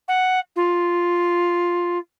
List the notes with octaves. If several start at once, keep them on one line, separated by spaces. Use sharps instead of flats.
F#5
F4